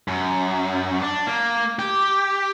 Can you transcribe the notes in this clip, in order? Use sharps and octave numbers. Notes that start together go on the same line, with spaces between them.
F#2
D4
A#3
G4